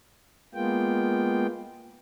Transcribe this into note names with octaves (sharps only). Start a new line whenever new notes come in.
G#3 A#3 B3 F4 G5